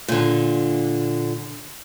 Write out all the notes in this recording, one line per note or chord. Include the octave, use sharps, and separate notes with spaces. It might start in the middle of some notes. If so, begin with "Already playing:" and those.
A#2 D3